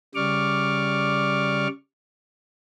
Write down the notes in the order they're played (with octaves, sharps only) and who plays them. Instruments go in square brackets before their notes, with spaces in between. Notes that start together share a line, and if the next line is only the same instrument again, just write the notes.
[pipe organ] C#3 G3 D5 C#6 D6 F6